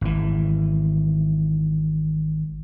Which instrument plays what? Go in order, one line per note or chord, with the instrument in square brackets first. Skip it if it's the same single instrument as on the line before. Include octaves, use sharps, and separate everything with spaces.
[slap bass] G#1 E3